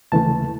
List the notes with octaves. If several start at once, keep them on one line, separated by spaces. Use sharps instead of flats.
D#2 C#3 E3 A3 A5